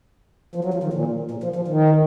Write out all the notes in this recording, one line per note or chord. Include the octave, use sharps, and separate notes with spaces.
F3
F#3
F3
D#3
A#2
A#2
F3
F3
D#3